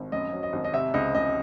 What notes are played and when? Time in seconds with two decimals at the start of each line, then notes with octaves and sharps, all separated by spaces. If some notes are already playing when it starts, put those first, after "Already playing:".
Already playing: G#1
0.12 F#2 D#5
0.33 F#3
0.43 D#5
0.53 G#1
0.64 D#5
0.73 C3 E5
0.94 C#2 D#5
1.15 C#2 D#5